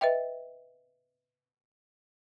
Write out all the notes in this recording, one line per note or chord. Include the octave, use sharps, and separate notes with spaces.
B4 D#5 E5 G5